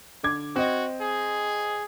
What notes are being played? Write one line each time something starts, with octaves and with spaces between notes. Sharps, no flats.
D3 D6 G#6
C4 F#4 D#5
G#4